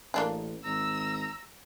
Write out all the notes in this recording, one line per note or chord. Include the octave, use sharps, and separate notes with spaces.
A1 A#3 D4 G#4
G#1 A#5 E6